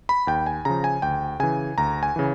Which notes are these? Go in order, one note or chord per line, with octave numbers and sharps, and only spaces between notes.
B5
D#2 G5
G#5
C#3 F3 A#5
G#5
D2 G5
C#3 E3 G#5
D2 A#5
G#5
C#3 E3